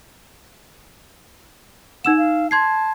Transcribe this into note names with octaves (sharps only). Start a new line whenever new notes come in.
D#4 F#5 E6 E7
F5
A5 C6 G#6 C7